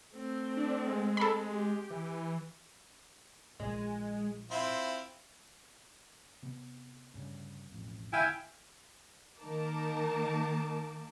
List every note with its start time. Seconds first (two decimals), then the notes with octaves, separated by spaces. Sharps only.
0.13 A3 C4
0.57 D4
0.87 G#3
1.17 A4 B5
1.50 G4
1.90 E3
3.60 A#1 G#3
4.51 C4 E4 F4 C6
6.43 C3 B3
7.14 D2 G2 C#3
7.72 E1 A1 F2
8.13 F1 D3 E4 F5 G5 G#5
9.40 D#3 A#3 D#4 A#4 A5 D6